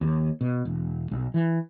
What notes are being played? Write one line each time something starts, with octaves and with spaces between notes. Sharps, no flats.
D#2
B2
E1
B1
E3